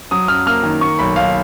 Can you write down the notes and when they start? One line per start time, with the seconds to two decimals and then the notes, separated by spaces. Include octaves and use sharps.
0.11 F#3 D#6
0.28 F#2 F6
0.47 A#3 F6
0.63 D#3
0.81 A#3 C#6
0.99 B1 B5
1.16 B1 F5